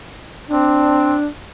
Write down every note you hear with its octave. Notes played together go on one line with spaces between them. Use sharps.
C4 D4